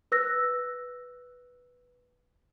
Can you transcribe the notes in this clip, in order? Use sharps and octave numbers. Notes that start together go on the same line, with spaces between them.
B4 E6 F#6 A#6